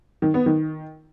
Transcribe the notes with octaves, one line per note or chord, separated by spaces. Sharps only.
D#3
B3
D#3